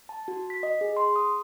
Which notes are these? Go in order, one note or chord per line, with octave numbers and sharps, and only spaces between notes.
A5
F#4
B6
D#5
G#4
C6
D#6